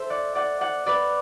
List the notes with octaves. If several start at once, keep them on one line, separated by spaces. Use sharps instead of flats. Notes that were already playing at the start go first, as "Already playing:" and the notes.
Already playing: A4 C5 E5
D5 F#5
D5 F#5
D5 F#5
B4 D5